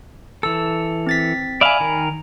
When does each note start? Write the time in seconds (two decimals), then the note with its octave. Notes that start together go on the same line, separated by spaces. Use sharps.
0.43 E3 A4 E6
1.07 C4 A6 B6
1.61 D5 E5 F5 G#5 B5
1.80 D#3 A#4